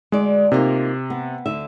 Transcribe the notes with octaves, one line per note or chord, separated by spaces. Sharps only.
D2 G#3 D5
C3 A#3 D#4 F4
B3
D2 D3 E5